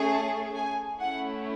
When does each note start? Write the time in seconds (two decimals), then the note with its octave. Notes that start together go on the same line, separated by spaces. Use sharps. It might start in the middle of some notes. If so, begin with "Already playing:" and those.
Already playing: A3 C#4 G#4
0.11 A5
0.56 G#5
1.00 A3 C#4 E4 F#5